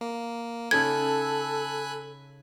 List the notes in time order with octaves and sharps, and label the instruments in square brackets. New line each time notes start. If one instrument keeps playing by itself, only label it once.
[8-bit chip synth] A#3
[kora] C#3 D#4 C#5 [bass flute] A4 [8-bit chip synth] G#5 B5 F#6 [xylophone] G#6